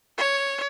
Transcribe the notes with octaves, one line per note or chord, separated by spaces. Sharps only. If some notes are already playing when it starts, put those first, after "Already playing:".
C#5